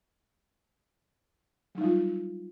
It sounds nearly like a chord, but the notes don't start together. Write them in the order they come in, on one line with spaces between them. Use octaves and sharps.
F#3 D#4 G3 F4